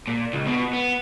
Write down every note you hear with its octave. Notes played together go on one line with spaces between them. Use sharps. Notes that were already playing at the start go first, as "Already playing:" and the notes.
A#2
C#2
B2
B3